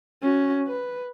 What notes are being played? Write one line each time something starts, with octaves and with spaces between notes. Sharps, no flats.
C#4 F#4
B4